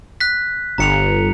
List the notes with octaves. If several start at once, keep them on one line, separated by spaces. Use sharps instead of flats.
F#6 B6
G1 A#5 C#7 F7